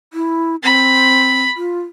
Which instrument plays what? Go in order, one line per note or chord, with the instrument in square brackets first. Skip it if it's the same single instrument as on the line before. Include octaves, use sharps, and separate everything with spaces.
[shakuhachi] E4
[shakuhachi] C4 [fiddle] B5
[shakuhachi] F4